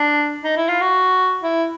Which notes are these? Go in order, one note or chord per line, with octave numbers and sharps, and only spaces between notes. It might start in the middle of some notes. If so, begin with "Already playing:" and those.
Already playing: D4
D#4
E4
F4
F#4
E4